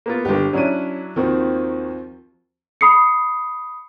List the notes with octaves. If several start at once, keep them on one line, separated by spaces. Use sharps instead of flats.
A#3 B3 F4
G1 G4
F#3 C#4 D4 E4 D#7
D#2 D#3 F3 C4 F#4
B5 D#6 C7 C#7